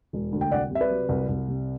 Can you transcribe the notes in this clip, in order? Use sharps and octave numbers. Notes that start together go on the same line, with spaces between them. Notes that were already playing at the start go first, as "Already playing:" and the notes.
E1
D2
G5
C2 D5 F#5
C3 E5
B4 D5
F#3
C2
C2
C3